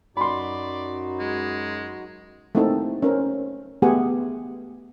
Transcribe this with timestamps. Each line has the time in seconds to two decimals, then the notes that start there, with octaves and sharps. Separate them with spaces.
0.17 F#2 D#4 F#4 D5 B5 C6
1.19 G#3
2.55 A3 A#3 C4 D#4 E4 A4
3.02 C#4 A#4 C5
3.82 A3 B3 G4 G#4 F#5 G#5